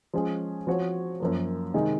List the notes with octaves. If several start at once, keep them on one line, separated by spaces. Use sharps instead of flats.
F3 G#3 C#4 G#4
F3 C4 F#4 C#5
F#2 F3 A#3
C3 D#3 G#3 D#4 G#4